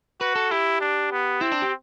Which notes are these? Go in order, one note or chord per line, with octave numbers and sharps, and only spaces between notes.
F#4 B4
A4
E4 G4
D4
B3
C4 E4
D4
G4